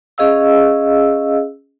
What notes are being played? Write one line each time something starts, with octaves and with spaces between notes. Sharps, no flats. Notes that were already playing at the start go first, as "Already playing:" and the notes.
C#4 G#4 D#5 F5 E6